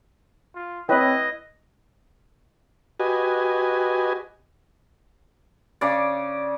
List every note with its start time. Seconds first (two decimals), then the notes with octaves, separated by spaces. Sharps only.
0.55 F4
0.89 C4 E4 B4 C#5 D#5 G5
3.00 F#4 G4 B4 D#5 G#5
5.81 C#3 D5